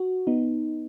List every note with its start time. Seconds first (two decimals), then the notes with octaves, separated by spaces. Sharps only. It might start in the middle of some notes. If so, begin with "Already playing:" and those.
Already playing: F#4
0.27 B3 D#4